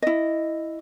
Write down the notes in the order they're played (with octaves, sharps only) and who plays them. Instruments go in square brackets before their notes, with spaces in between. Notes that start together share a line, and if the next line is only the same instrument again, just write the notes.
[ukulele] E4 D#5